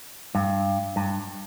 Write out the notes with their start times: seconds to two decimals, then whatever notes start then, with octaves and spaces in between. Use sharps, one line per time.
0.35 G2
0.96 G2